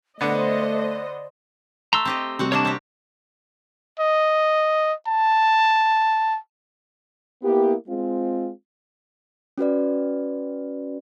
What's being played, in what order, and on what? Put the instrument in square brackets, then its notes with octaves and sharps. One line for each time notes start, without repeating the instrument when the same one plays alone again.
[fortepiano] D3 B3 [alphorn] A3 [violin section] C5 D#5 [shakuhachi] D5
[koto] A3 [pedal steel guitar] A#5 C6 E6
[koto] C4 G4 D#5
[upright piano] C3 G3 [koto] C4 F#4 F#5
[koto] A#3 D4 F#4 [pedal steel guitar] C#5 D#5 A5
[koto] C4 G4
[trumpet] D#5
A5
[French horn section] A#3 B3 E4 G4
G#3 C4 F4
[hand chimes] C#4 F#4 B4 D5